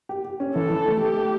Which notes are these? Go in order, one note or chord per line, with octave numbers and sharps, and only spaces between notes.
G4
G4
C#4
E3 A4
E3
A3
A3 G4
A3